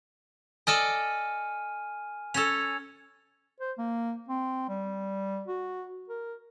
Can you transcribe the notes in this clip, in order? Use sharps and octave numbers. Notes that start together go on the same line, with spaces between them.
A4 D5 D#5 G#5 F6 D#7
C#4 A4 E6 G#6 F7
C5
A#3
C4
G3
F#4
A#4